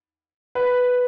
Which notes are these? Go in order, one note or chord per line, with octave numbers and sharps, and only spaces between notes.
B4